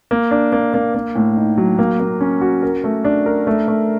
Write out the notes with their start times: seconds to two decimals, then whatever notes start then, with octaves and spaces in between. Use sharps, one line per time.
0.11 A#3
0.31 D4
0.52 A#3
0.74 A#3
0.94 A#3
1.15 A2
1.37 D#4
1.57 F#3
1.79 A#3
2.00 A#3
2.21 C#4
2.41 F#4
2.63 A#4
2.84 A3
3.05 D4
3.26 A#4
3.47 A3
3.68 A3